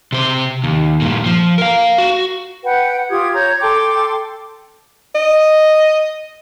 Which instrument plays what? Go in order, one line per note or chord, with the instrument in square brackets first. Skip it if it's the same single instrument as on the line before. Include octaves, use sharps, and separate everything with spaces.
[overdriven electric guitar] C3 C5
D#2
G2 A#2
F3
A#4 F5
F#4
[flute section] B4 F#5 G5
F4 G4 D#6 G#6
C#5 A#5 G6 G#6
A4 G5 C6 D6
[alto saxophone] D#5